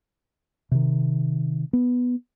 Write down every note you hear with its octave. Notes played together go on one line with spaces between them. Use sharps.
C3 D#3
B3